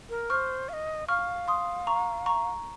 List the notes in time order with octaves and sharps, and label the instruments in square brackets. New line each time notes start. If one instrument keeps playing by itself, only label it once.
[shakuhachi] A#4
[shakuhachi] C5 [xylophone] C#6 F6
[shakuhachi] F5
D#5
[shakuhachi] F5 [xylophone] C#6 F6
[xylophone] C6 D#6
A#5 C#6
A#5 C#6